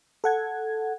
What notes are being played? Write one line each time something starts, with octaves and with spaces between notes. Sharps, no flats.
A4 F#5 G#6